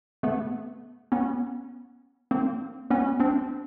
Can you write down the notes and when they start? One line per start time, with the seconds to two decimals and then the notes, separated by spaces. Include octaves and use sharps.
0.23 A3 B3
1.12 B3 C#4
2.31 A#3 C4
2.90 B3 C#4
3.20 C4 D4